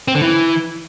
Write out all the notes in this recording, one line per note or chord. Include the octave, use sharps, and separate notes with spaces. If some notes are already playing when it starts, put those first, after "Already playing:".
C4
D3
E3